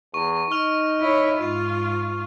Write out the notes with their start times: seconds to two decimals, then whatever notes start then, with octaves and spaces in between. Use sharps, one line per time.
0.14 E2 C#6
0.51 D#4 C#6 F6 F7
1.00 E4 C#5
1.38 G#2 F4